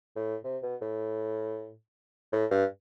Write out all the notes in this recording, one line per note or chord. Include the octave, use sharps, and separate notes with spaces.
A2
C3
B2
A2
A2
G2